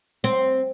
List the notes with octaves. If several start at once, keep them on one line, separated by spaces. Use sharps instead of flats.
C4